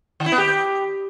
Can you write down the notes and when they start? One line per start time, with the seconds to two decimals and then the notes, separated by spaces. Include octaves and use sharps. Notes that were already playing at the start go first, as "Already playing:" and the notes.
0.20 D#3
0.26 E4
0.32 B3
0.38 G4